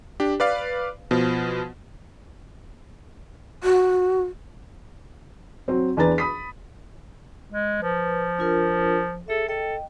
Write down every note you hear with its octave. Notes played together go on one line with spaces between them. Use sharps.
D4 G4
B4 D5 F5
B2 F3
F#4
F#3 C4
E2 D4 B4 A#5 A6
B5 D#6 B6
G#3
F3 B4
D4 F4 A#4
G#4 A4 E5
A4 D#5 G5